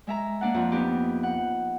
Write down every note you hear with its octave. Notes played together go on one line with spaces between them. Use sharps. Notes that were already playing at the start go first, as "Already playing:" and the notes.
G#3 E5 A#5
A#3 D4 F#5
F2 C4
B3 D#4 G4
F#5